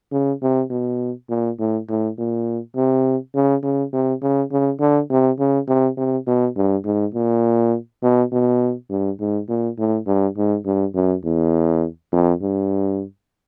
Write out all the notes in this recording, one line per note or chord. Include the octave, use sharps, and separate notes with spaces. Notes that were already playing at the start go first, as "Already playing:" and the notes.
C#3
C3
B2
A#2
A2
A2
A#2
C3
C#3
C#3
C3
C#3
C#3
D3
C3
C#3
C3
C3
B2
G2
G#2
A#2
B2
B2
G2
G#2
A#2
A2
G2
G#2
G2
F#2
E2
F2
G2